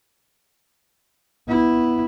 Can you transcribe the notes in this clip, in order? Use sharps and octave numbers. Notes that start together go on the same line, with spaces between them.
B3 E4